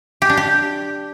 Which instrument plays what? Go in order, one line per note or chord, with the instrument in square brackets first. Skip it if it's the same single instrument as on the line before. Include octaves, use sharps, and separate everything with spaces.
[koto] G4
D4
G4